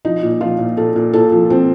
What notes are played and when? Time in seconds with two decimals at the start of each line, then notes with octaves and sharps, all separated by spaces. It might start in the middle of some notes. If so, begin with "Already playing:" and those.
0.05 F3 D#4
0.23 A#2
0.41 F3 F4
0.59 A#2
0.77 A#2 A4
0.96 A#2
1.13 A#2 A4
1.32 F3
1.50 F3 C4